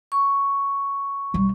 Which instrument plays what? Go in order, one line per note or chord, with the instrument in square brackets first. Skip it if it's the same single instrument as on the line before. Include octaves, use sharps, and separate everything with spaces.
[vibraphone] C#6
[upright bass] B1 G3